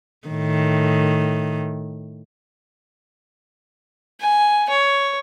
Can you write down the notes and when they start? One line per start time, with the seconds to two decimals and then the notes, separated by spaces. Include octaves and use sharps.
0.27 A2 D#3
4.20 G#5
4.69 C#5